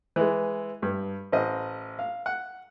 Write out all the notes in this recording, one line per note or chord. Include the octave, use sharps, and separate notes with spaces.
E3 G#3
G2
A1 C5 D#5
F5
F#5